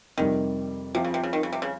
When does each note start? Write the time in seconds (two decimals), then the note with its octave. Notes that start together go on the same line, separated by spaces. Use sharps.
0.17 F2 C3 D#3 G3
0.95 C3 F3 C4 F4
1.04 C#3
1.14 C3
1.23 C#3
1.33 D#3
1.43 C#3
1.52 C3
1.62 C#3